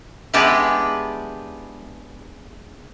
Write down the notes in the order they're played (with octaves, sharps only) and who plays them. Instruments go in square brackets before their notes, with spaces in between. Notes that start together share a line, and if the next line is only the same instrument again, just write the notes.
[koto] G#3 B3 D4 E4 G4 B4